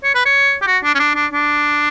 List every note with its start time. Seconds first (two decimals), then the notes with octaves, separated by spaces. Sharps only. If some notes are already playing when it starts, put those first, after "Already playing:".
0.04 C#5
0.15 B4
0.25 C#5
0.62 G4
0.67 F#4
0.84 D4
0.94 C#4
0.99 D4
1.15 D4
1.32 D4